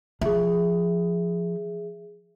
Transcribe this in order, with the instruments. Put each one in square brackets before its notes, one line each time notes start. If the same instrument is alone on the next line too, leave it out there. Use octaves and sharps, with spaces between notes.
[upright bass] F3 [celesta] G#4 E5